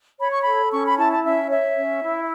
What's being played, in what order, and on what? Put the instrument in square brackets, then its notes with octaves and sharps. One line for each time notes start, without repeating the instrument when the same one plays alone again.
[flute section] C#5 B5
C#6
A4 B5
C#4 C#6
B5
E4 A5
A5
C#4 E5
C#5 E5
C#4
E4